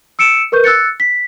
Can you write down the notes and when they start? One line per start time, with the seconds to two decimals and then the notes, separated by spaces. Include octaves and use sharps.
0.19 E6 C#7 D7 E7
0.52 A#4 B4 C#6 G6
0.64 E6 F#6 A6 C#7
1.00 B6